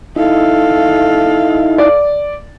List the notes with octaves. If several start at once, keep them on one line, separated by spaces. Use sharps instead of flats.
D#4 E4 A4 F5
D5